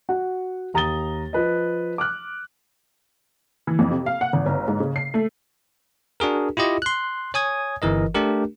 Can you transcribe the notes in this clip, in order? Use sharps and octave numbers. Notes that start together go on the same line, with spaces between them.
F#4 F#5
D#2 A#5 D#6 A6 G7
F3 B4 D#5
D6 F6 F#6
E3
F2
C3
F5
F#5
G#1
G1
G#2
C#3
C7
A3
D4 F#4 G#4 A#4
E4 F4 G4 D#5
C6 F#6
C#5 G#5 D#6 G#6
G1 E3 A#4 D#5
A3 D4 G4 A#4